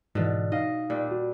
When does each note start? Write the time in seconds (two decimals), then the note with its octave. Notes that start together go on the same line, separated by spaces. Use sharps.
0.15 G#2 B2 D3 E3
0.52 D#4 D#5 F5
0.90 A#2 G3 D4
1.11 F#4